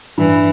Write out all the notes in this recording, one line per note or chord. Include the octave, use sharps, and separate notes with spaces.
G2 E3